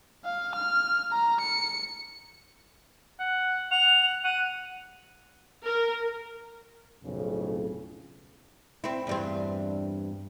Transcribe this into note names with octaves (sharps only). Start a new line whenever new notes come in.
F5
F6
A#5
C#7
F#5
F#5 F7
F#5 D#7
A#4
B1 F2 A2 C#3
C4 E4
E2 G2 C4